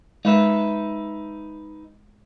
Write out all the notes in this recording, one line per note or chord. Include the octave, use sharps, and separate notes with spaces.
G#3 D#4 B4 E5